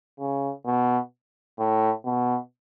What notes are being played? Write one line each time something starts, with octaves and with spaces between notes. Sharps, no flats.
C#3
B2
A2
B2